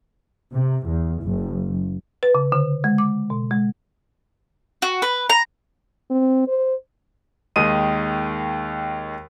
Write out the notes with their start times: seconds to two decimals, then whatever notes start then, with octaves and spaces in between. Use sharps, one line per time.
0.53 C3
0.87 E2
1.22 F#1
2.23 B4
2.35 C#3
2.52 D3
2.84 G#3
2.98 D6
3.30 B2
3.51 G#3
4.82 F#4
5.02 B4
5.30 A#5
6.11 C4
6.48 C5
7.56 D#2 D#3 G#3 D#6 D#7